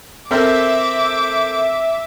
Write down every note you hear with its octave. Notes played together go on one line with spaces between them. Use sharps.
C4 A4 A#4 E5 D6